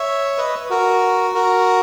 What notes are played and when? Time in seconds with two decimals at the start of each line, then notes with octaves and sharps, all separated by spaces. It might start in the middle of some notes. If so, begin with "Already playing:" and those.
Already playing: C#5 E5
0.38 B4 D#5
0.70 F#4 A#4
1.35 F#4 A#4